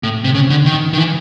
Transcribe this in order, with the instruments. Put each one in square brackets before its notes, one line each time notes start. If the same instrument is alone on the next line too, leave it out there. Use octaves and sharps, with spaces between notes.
[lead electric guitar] A2
C3
C#3
D3
D#3
D#3
E3